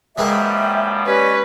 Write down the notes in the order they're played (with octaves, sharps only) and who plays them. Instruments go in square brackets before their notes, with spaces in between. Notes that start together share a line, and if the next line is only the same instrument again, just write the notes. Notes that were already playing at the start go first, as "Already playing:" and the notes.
[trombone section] F#2 F3 G3 [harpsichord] E3 G#3 A#3 [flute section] E5 G5
[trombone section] C#4 [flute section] G4 D5 D#5 [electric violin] B4